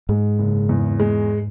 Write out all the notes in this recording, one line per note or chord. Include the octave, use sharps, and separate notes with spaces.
G#2 G#3
F#1
E2
G#3